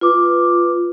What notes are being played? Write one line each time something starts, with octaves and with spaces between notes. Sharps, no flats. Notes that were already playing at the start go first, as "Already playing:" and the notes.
F4 B4 D6